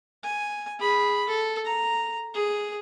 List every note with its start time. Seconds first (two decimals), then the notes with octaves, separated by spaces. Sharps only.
0.24 G#5
0.79 G#4 B5
1.27 A4
1.65 A#5
2.34 G#4